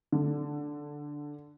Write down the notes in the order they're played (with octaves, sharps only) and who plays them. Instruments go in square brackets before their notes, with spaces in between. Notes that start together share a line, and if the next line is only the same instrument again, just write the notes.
[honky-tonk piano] D3